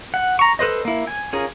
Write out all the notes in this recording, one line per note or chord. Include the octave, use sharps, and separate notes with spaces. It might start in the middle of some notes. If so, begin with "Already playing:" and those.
F#5
A#5 C#6
A4 B4 C5 D#5
A#3 E4
G#5
C#4 F4 G#4 A#4